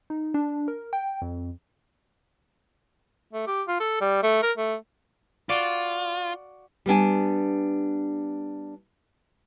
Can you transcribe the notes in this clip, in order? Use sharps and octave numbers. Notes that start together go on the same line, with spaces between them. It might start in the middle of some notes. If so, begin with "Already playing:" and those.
D#4
D4
A#4
G5
F2
A3
G4
F4
A4
G3
A3
A#4
A3
F4 F#4 D5 F5
G3 B3 D4 G#5